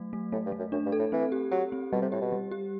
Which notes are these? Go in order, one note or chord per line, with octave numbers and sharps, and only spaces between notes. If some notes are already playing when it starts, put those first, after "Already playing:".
Already playing: F#3 A3
A3
A2 A3
G2
A3
F#2
F#2 D4
G2
A4
A2
E3 C4
G4
F#3 G4
C4
B2 G3
C3
A2 G4
B2
G3
G4